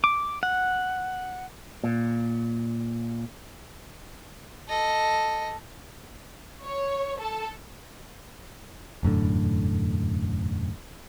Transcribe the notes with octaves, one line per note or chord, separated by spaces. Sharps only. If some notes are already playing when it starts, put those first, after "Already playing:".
D6
F#5
A#2
A4 D#5
C#5
A4
E1 F#2 A2 D3